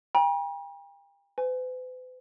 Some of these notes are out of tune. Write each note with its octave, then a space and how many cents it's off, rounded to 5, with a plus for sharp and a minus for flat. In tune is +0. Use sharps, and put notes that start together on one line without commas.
G5 +35 A#5 +45
B4 +45 G#5 +0